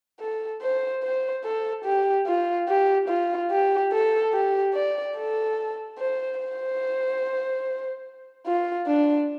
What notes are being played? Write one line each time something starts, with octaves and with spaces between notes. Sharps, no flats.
A4
C5
C5
A4
G4
F4
G4
F4
G4
A4
G4
D5
A4
C5
C5
F4
D4